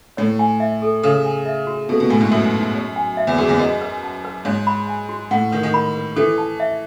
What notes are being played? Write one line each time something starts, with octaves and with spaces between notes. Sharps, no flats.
A2 C#5
G#5
E5
A4
C#3 A4
G#5
E5
F#4
B2 A4
B2
A2 G#5
G#2
F#2 E5
D#4
C#5
G#5
E5
E2
F#2 G#4
E2
F#2 D#5
B4
A5
B4
G#2 C#5
B5
G#5
F#4
A2 F#5
D#3 B4
D#3
B5
B4
E3 A4
A5
E5